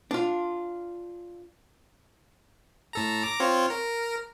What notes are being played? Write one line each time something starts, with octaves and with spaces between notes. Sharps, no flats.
D4 F4
A2 A4 A#5
A#5 D6
C4 F4 C#5
A#4